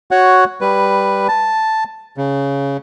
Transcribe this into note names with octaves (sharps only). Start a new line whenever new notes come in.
F#4 C#5 F#5
G3 B4
A5
C#3